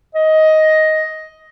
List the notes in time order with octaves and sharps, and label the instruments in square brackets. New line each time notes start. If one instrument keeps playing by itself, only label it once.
[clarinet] D#5